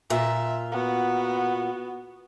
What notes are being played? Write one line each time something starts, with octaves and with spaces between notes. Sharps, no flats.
A#2 F4 E5
B3 F#4